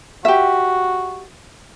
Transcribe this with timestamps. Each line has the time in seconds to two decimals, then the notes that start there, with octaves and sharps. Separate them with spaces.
0.25 F#4 G4 E5